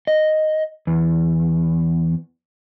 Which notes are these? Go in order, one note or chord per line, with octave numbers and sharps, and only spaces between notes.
D#5
E2